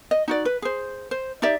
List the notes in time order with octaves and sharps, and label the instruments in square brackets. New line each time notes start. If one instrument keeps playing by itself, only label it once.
[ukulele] D#5
D#4 F#4 D5
B4
G#4 C5
C5
D#4 G4 D5 E5